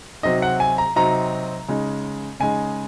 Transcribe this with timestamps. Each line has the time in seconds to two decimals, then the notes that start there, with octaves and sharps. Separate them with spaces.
0.23 C3 F#3 C4 D#4 D#5
0.42 F#5
0.60 G#5
0.78 A#5
0.96 C3 F#3 C4 D#4 A#5
1.69 C#3 G#3 D#4
2.40 C#3 G#3 D#4 G#5